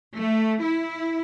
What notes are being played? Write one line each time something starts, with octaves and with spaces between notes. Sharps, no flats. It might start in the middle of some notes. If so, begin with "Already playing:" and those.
A3
E4